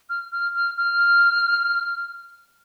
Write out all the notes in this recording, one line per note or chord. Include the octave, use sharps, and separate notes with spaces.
F6
F6
F6
F6